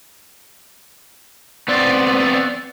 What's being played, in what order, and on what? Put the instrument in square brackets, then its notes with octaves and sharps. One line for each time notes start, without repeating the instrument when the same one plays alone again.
[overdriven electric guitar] B3 C4 [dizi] D5